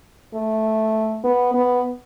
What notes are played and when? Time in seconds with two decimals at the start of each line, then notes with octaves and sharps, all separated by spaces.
0.34 A3
1.24 B3
1.54 B3